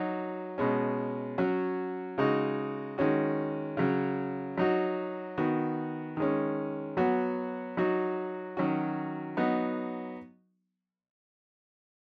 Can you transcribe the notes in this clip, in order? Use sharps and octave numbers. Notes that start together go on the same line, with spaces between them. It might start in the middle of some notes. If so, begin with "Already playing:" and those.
Already playing: F#3 D#4 F#4
B2 G#3 C#4
F#3 C#4 F#4
C#3 G#3 D#4 F#4
D#3 G#3 C#4 F#4
C#3 F#3 C#4
F#3 D#4 F#4
D#3 B3 F#4
D#3 G#3 C#4
F#3 B3 F#4
F#3 D#4 F#4
D#3 F#3 C#4 F#4
F#3 B3 D#4